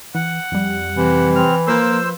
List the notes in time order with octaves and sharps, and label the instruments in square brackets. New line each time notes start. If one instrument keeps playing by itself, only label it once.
[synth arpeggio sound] E3 [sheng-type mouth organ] F#5
[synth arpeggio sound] F2 G3
[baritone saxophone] C3 [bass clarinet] E3
[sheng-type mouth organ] C4 F6
[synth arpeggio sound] F3 B4 C6 [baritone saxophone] A#3 [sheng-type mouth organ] C5 E6